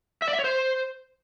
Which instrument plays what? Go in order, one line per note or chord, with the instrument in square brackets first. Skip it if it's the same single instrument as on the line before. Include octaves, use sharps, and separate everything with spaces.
[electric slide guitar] E5
D5
E5
C#5
C5